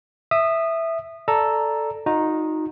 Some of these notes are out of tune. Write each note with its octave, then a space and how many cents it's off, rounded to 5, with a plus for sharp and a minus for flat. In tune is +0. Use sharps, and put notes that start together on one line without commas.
E5 +0 D#6 -20
A4 +0 D5 +0 A#5 +0
D#4 +0 F#4 -45